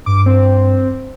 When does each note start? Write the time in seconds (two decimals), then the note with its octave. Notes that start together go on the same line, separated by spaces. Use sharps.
0.06 G2 D6
0.26 C4